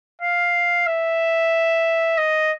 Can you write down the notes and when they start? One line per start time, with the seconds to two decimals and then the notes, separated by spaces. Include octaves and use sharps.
0.22 F5
0.87 E5
2.18 D#5